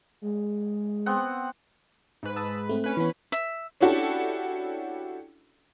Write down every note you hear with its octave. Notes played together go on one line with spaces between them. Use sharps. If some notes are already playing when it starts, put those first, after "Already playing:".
G#3
B3 C4 F#5
G#2 B4
A5 D#6 E6
A3 C4
C#4 B4
E3 B3
E5
C#4 D4 E4 F#4 G4 A4